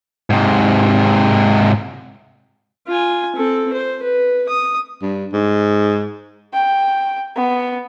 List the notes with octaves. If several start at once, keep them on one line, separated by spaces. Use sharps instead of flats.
G#2 C3
F4 G#5
C4 A4
C5
B4
D#6
G2
G#2
G5
B3